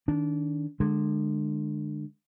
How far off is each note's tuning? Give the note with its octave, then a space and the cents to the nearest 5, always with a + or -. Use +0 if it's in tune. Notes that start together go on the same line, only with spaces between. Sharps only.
D#3 +0 D4 -25
D3 +25 G#3 +0